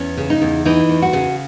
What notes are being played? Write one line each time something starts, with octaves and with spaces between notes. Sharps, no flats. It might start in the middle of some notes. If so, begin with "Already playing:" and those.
Already playing: E2 C#4
C#3
D#4
E2
E3 D#4
E2
F#4
C#3